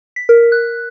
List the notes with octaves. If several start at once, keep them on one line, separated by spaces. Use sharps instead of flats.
B6
A#4
F#6